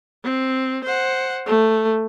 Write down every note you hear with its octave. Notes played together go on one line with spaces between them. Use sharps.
C4
C5 F#5
A3